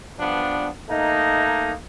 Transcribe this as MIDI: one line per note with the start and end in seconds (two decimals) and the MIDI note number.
0.18 0.67 43
0.18 0.67 53
0.18 0.67 59
0.18 0.67 62
0.89 1.73 57
0.89 1.73 58
0.89 1.73 63